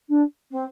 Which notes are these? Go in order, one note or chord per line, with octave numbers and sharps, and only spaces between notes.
D4
C4